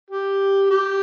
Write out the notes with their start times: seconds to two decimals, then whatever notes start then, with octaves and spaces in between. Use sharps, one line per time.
0.11 G4
0.70 G4